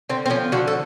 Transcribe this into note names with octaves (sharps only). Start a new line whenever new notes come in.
D3 C4
C4
F3 C#4
D3 F#4
A4